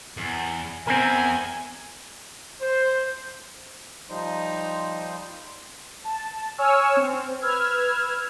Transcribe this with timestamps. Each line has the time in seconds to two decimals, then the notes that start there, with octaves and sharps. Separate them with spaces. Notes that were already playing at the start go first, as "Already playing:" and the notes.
0.17 E2
0.87 E2 C4 E4 A#4 G#5
2.61 C5
4.10 F3 G3 D#4 C5
6.04 A5
6.58 C#5 G#5 C#6 E6 F6
6.97 C4
7.42 B4 E6 F6 G#6